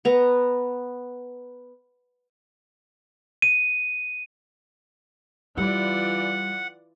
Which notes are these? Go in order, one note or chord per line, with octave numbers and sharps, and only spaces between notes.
B3 A#5
D#7
E3 G3 F4 D5 F#5